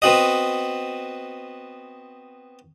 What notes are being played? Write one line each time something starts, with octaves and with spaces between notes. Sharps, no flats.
B3 C4 F#4 D#5